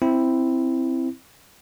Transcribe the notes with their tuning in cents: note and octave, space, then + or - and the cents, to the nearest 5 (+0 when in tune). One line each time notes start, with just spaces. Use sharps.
C4 +0 E4 +0